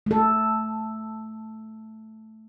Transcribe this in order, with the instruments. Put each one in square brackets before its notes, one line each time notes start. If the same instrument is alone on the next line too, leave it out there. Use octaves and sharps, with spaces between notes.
[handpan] A3 A4